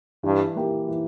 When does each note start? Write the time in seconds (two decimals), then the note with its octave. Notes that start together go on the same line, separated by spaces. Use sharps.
0.23 G2 E3
0.56 A#3 E4 G4
0.88 E3